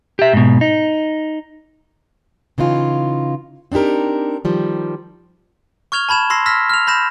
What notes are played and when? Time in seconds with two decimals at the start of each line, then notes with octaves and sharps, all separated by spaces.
0.19 G4 E5
0.33 G#2 B2
0.61 D#4
2.58 C#3 E3 D#4 F4
3.72 C4 D4 D#4 G4 A#4
4.45 D#3 F3 G3
5.92 C#6 F6 G#6 F7 G7
6.09 A5 B5 G#6 E7
6.30 C6 E6 A#6 C7
6.46 E6 F6 A#6 B6
6.70 F6 F7
6.87 B5 G6 A#6 E7